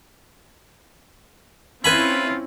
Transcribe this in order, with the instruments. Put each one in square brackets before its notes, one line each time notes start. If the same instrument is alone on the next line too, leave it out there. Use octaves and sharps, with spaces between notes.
[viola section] C4 C#4 E4 [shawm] F4 [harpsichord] B4 G#5 B5